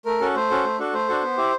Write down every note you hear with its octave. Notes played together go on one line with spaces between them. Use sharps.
A3 A#4
C#4 F#4 A4
A3 C5
C#4 F#4 A4
A3
D4 F#4 A4
A3 C5
D4 F#4 A4
B3
E4 G4